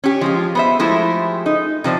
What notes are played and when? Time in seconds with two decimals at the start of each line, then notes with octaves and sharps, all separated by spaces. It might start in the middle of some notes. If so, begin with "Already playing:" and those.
0.04 C#4 G4
0.21 F3 G#3 F4
0.55 B3 C5 E5
0.79 F3 G#3 A3 E4 G4 C5
1.46 D#4
1.84 C3 F3 C5 D5